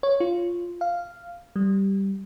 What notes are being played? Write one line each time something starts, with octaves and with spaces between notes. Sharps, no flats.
C#5
F4
F5
G3